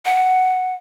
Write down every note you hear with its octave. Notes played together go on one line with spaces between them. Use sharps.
F#5